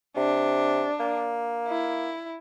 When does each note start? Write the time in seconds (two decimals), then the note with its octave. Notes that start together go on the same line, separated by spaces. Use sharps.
0.17 C3 D4
1.00 A#3
1.67 E4